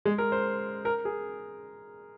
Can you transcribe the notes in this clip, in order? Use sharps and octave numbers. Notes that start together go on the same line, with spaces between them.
G#3
A#4
C5
A#4
G#4